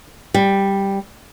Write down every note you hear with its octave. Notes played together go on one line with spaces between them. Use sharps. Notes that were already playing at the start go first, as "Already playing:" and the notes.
G3